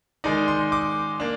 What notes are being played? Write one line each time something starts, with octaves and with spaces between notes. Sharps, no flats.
D#3 G#3 D#4 D5
C6
D6
A#3 D4